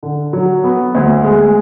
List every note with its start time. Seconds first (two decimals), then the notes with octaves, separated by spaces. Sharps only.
0.03 D3
0.33 F#3
0.64 B3
0.95 D2
1.24 G#3